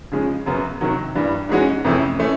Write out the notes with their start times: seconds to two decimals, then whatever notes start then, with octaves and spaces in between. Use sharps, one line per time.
0.12 C#3 F3 G#3 C#4
0.46 F#2 C#3 F#3 B3
0.81 C3 D#3 F#3
1.15 G2 E3 G3
1.49 G#2 E3 G#3 C#4 F#4
1.84 F2 C3 E3 A3 C#4
2.19 E3 A3 C#4